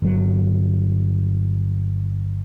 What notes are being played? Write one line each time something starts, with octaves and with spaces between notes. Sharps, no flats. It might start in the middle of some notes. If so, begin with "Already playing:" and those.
G1 F#3